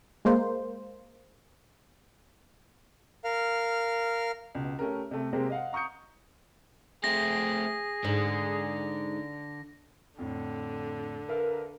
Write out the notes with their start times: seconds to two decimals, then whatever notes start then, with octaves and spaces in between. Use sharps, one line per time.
0.25 G#3 A#3 C5
3.24 A#4 F5 F6
4.55 C#2 B2
4.79 A3 C#4 G4 A#4
5.11 C3 A3
5.33 C3 G#3 A#3 C4 G4
5.50 D#5 F5 F#5
5.73 A#5 C#6 D#6 G6 C#7
7.04 A3 C4 G#4 A#6
8.05 G#2 D3
10.19 F2 A2 D3
11.28 A#4 B4 E5 F5